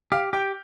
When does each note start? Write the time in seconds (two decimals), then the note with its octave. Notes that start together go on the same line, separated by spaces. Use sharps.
0.12 G4 F5 F6
0.33 G4 G5 G6